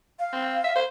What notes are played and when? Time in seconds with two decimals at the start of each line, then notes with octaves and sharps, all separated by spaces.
0.19 F5
0.33 C4
0.64 E5
0.76 C5